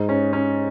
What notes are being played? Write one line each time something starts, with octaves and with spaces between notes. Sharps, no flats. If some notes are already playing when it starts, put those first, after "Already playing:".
Already playing: G#2
C#4
C#4